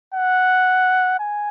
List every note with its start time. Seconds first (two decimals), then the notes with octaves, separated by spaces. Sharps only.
0.14 F#5
1.19 G#5